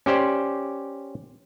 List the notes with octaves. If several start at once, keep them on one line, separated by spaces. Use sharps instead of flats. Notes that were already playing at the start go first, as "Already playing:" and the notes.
C#4 G4 C5 D5